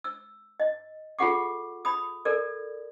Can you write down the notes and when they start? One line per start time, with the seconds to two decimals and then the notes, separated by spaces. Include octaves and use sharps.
0.04 E6
0.60 D#5
1.19 F4 G#4 A4 F#5 C#6 D6
1.85 B5 D#6
2.25 A4 A#4 D5